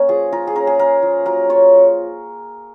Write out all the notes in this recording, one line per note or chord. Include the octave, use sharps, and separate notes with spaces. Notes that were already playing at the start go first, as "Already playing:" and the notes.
Already playing: A#3 C#4 A#4 C#5
F3 G#4
F4 A#4
G#4
C#4 A#4
G#4
A#3 A#4
F3
F#3 A#4
F4 C#5